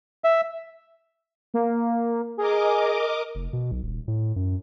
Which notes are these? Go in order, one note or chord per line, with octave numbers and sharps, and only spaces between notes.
E5
A#3
G#4 A#4 D#5 D6
F1
B2
B1
D#1
A2
F#2